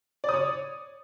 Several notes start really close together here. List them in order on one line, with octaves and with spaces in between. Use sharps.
D5 D#6 C#5